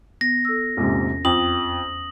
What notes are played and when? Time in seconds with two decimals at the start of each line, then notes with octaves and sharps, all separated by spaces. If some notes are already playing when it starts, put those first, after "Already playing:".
0.21 B3 A#6
0.45 A4 E6
0.77 A#1 E2 G#2 C3 C#4
1.25 F2 G5 D#6 F#7